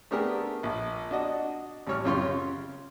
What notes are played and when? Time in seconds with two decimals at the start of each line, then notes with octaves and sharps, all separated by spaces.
0.11 A3 B3 D4 G4 G#4 A#4
0.63 A#1
1.11 D4 F#4 D#5
1.87 A1 G3 C#5 F6
2.05 F#2 C#3 F4 G4 C#5 C6
2.23 C#3